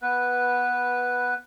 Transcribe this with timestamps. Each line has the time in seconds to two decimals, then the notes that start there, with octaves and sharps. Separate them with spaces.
0.02 B3 B4